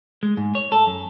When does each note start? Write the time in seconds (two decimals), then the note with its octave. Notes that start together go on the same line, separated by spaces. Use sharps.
0.23 G#3
0.37 G#2
0.55 C#5
0.72 A4
0.87 F#2